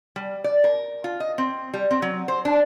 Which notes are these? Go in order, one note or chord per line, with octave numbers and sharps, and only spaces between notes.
G3
D5
A#4
F4
D#5
C4
G3
C4
F#3
C5
D4